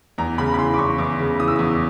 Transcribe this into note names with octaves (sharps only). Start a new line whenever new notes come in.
E2 A#5
C#3 B5
B5
E3 C6
D6
E2 C#6
E2 D6
C#3
E3 D#6
E6
E2 D#6